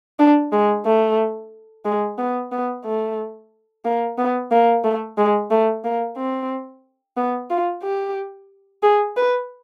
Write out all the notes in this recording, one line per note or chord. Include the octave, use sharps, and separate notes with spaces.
D4
G#3
A3
G#3
B3
B3
A3
A#3
B3
A#3
A3
G#3
A3
A#3
C4
B3
F4
G4
G#4
B4